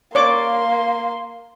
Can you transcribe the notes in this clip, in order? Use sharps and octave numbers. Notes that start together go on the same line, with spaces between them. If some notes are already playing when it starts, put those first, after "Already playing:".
A#3 C#5 D5 C6 D6